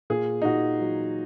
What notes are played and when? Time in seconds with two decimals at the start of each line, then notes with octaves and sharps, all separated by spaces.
0.10 A#2 G#4
0.42 D#4
0.45 A#2 F#4
0.81 F#3